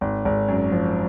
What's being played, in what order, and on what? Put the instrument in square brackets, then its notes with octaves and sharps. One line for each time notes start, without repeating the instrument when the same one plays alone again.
[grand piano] G#1
G#1
F#2
F3